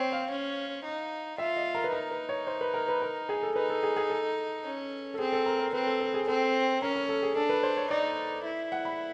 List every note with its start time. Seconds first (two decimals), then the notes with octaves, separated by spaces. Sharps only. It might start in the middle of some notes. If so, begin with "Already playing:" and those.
Already playing: C4 C5 C#5
0.12 F5
0.30 C#4
0.84 D#4
1.38 F4 E5
1.56 D#5
1.75 A#4
1.84 B4
1.92 D#4 A#4
2.11 B4
2.29 C#5
2.47 C5
2.61 B4
2.74 A#4
2.88 B4
3.02 A#4
3.29 G#4
3.43 A4
3.56 D#4 B4
3.70 A4
3.83 G#4
3.96 G#4
4.10 A4
4.65 C#4
5.14 A4
5.19 C4 G#4
5.33 A4
5.46 A#4
5.59 A#4
5.73 C4 B4
5.87 A4
6.00 A4
6.14 G#4
6.27 C4 A4
6.82 C#4 A#4
6.96 A#4
7.09 A4
7.23 G#4
7.36 D4 A4
7.49 B4
7.63 C5
7.77 C#5
7.91 D#4 D5
8.45 E4
8.72 F#5
8.85 B5